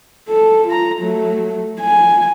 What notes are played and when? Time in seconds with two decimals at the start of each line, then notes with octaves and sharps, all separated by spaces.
0.29 A4
0.68 F4 A#5
1.00 F#3 A3
1.81 G#5